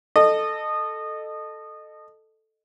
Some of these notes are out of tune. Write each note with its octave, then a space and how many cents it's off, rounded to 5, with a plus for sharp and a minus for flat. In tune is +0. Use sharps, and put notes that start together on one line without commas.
A4 +0 D#5 -20